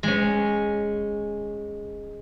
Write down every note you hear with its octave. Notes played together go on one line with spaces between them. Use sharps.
G#3 C#4